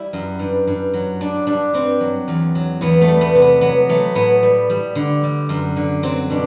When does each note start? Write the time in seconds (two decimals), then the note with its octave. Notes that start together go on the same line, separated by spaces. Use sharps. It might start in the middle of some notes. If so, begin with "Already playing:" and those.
Already playing: G3 E4
0.13 F#2
0.39 G2
0.67 G2
0.94 F#3
1.20 G3 D4
1.47 G3 D4
1.74 G2 C4
2.00 F#3
2.28 E2
2.55 F#3
2.81 E2 B3
3.01 A3
3.08 G3
3.21 B3
3.35 C3
3.42 B3
3.61 F#3 B3
3.89 F#3 A3
4.15 A2 B3
4.43 G3
4.70 G3
4.95 D3
5.23 G3
5.49 F#2
5.76 D3
6.03 F#3 C4
6.30 B2 D4